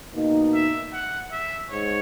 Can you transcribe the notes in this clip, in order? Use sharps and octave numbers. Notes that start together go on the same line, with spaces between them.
B2 A#3 D#4
E5
F#5
E5
G#2 C#5